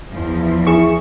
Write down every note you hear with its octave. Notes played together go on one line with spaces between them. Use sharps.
E2 E3 F3
E4 G#4 C#6